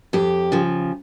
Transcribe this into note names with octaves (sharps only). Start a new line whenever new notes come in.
F2 G4
C#3 F3